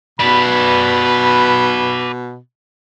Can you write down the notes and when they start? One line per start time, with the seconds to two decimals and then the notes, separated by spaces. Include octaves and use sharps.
0.19 B2 B4 D5 B5